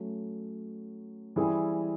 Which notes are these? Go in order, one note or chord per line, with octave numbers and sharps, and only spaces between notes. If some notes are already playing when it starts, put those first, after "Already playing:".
Already playing: F#3 A3 C#4
E3 G3 C4 E4 G#4